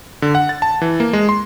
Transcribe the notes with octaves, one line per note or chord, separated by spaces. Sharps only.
D3
F#5
A6
A5
E3
A#3
G#3
C6